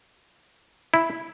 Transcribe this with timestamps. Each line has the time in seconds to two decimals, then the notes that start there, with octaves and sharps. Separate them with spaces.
0.94 E4